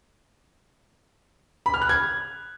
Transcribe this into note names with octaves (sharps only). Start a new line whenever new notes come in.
B5
F6
F#6
G#6